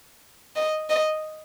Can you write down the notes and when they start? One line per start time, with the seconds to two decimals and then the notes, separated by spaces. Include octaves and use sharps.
0.56 D#5
0.90 D#5